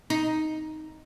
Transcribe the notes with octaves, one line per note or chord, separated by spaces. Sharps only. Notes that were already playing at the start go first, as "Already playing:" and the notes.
D#4